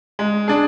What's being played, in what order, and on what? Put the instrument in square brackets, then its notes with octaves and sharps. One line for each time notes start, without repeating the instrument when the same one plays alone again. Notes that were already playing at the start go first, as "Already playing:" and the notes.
[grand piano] G#3
D4 G#4